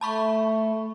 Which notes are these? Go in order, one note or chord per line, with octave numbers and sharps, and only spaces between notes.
A3 A5 B5 C#6